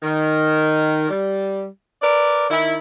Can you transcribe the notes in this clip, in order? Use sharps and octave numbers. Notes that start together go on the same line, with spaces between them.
D#3
G3
A#4 B4 D5
D#3 E4